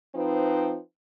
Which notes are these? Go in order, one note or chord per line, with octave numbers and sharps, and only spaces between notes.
F3 C4 D#4 B4